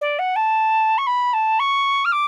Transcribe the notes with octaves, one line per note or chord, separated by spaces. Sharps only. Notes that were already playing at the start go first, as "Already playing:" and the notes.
D5
F#5
A5
C#6
B5
A5
C#6
F6
D6